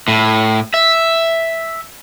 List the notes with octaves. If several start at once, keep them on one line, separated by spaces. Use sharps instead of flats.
A2
E5